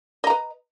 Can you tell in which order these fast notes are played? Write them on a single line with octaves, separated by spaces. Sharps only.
D#5 A#5 B4